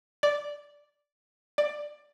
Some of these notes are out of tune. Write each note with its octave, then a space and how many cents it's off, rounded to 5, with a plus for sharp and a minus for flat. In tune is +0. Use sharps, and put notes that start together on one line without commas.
D5 -5
D5 +15